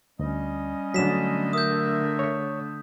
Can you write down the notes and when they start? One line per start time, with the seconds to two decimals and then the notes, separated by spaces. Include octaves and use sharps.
0.19 D2 G3 C#4 D#5
0.94 D3 F#3 A3 D4 B6 E7
1.53 A#4 E5 D#6 G6
2.19 C#5 C#6